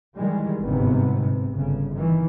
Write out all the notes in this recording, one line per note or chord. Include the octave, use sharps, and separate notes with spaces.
D#3 E3 G3 G#3
G1 G#2 C3 B3
C3
G1 C#3
D#3 E3